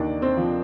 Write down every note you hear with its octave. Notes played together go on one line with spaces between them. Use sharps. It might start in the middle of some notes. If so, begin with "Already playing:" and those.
Already playing: D#2 D4 D#4 D5
C4 C5
F3